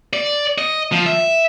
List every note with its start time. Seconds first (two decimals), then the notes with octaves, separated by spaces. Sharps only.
0.13 D5
0.58 D#5
0.92 F3
1.06 E5